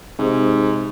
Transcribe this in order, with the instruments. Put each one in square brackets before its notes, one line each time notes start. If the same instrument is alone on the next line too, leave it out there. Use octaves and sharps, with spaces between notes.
[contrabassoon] G#2 [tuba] C3